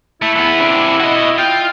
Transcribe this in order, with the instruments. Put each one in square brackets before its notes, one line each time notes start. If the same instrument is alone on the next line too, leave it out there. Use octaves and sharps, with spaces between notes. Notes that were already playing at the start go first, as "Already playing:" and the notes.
[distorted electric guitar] A3 [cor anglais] E4
[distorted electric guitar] E3 B3
C3 D4
F#4 D#5
[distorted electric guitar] F4 [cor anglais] G5